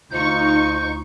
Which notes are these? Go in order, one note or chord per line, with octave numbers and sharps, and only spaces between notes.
D2 D#4 F4 C5 C#6 G6